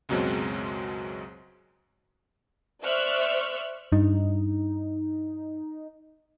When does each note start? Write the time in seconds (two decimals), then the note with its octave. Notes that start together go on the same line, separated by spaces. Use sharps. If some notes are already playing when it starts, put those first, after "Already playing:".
0.09 C#2 F#2 B2 F#3 G#3 C4
2.84 C5 D5 E5 C#6 F6 F#6
3.92 G2 D#4